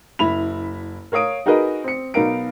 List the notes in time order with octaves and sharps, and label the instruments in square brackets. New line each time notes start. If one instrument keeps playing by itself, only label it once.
[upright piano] F#1 E4 B5 F7
A#4 C#5 F5 D#6 D7
D#4 F#4 G#4 A#4 B4 D#5
C4 C#7
B1 B3 D#4 A#4 F5 D7